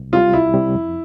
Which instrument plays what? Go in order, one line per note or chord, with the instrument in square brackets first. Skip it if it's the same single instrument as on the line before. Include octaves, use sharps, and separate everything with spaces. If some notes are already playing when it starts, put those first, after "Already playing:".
Already playing: [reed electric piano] C2
[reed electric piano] C3 G3 [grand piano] F4
[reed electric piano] C2 [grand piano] E4
[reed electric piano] C3 G3
F2